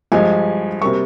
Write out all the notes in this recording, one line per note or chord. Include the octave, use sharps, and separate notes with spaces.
G2 F3 G#3 G#5
C3 G3 A#3 C#6